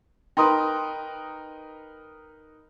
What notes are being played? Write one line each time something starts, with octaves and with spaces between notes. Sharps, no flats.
D#4 A#4 B4 G5 C6 D#6